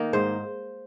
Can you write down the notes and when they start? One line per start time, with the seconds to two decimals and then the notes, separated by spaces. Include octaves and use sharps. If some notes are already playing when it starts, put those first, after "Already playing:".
Already playing: D#3 A#3 D#4
0.13 G#2 C5